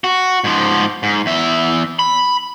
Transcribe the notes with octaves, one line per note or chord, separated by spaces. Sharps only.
F#4
G#2 F3
G#2
E2 E5
B5